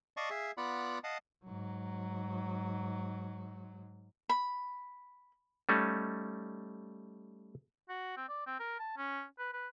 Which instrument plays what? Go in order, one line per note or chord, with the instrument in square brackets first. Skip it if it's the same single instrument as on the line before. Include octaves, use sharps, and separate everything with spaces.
[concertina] D5 D#5 F5 A5 C#6
G#4 E5 F5
B3 F4 D5 F#5 B5
D#5 F5 F#5 A5
[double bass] G#2 F#3
[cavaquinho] B5
[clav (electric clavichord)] G3 A3 C#4 D#4
[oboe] F#4
C4
D5
C4
A#4
A5
C#4
B4
B4